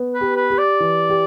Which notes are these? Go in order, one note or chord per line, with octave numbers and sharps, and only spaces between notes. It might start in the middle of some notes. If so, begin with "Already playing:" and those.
Already playing: B3
B4
G4
B4
G4
D5
E3
G4